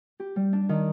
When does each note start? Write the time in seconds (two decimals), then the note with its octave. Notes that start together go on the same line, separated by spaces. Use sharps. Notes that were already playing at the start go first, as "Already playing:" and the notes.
0.20 G4
0.36 G3
0.53 D4
0.69 D#3